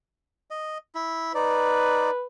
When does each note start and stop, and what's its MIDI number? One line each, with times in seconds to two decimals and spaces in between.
0.50 0.78 75
0.95 1.33 64
1.35 2.11 63
1.35 2.26 71
1.35 2.11 74